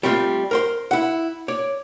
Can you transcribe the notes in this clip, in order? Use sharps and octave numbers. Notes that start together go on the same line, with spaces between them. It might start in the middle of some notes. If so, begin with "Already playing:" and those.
G3 A3 C4 D4 F4
A#4 C5 C6
E4 F#5
C#5 D5